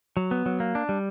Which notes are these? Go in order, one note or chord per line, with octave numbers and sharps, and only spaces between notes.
F#3
B3
F#3
A#3
D4
G3